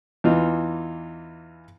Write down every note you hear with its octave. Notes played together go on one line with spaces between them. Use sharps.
E2 E3 D#4 F4